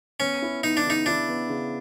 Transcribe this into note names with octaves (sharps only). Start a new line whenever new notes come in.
B3 C#4
E4
B3 D#4
D4
C#3 D#4
D4 E4
B3
C#3